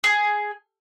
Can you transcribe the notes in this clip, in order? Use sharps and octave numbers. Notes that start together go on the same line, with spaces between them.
G#4